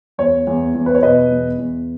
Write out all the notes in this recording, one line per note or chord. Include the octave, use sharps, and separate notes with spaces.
E2 C#5
E2
E2
B4
C#5
B2 B4 D#5
E2
E2